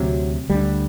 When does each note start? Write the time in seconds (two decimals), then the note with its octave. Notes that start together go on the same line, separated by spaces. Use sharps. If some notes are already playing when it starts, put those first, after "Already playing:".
Already playing: D2 C3 F#3
0.50 D2 D3 G3